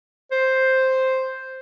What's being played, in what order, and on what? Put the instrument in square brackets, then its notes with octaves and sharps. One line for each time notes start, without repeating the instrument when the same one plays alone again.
[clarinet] C5